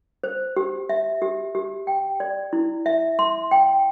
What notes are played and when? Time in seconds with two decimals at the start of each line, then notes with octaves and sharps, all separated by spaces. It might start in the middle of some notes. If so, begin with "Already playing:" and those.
0.24 C5
0.56 G4
0.89 E5
1.22 G4
1.55 G4
1.87 G5
2.20 D5
2.53 E4
2.86 E5
3.19 C6
3.51 G5